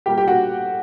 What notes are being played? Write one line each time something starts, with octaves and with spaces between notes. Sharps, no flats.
A#2 G3 A#3 G4 G5
G4 G5
F#4 F#5